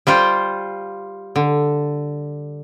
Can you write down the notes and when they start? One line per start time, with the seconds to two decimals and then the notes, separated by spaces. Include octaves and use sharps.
0.07 G3 F4 C5 G5
1.36 D3